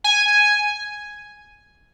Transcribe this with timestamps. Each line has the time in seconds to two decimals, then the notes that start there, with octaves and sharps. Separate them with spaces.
0.04 G#5